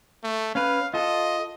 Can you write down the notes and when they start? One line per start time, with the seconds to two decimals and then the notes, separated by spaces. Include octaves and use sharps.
0.24 A3
0.55 C#4 B4 F5
0.94 F4 A4 D#5